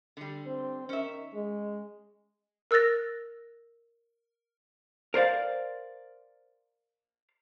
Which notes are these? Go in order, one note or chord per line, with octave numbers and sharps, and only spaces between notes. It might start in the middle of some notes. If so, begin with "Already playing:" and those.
D3 G3
C4
D#3 C#4 E5
G#3
A#4 E6 F#6 A6 A#6
A#4 C5 D5 F5